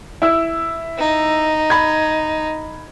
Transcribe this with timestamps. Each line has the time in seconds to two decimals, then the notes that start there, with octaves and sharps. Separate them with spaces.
0.22 E4 E6
0.98 D#4
1.70 B5 G#6